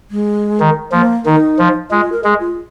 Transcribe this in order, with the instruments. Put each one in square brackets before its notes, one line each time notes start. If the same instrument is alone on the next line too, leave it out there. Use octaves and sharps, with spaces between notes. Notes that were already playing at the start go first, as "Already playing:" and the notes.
[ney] G#3
[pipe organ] D#3
[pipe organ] F3 [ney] A#3
[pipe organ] D#3 [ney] D#4
[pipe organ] F3
[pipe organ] G#3 [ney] F4
[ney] A#4
[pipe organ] G#3 [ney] G#4
[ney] F4